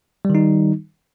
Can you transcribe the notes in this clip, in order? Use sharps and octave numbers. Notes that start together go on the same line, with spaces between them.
D#3 G3 D#4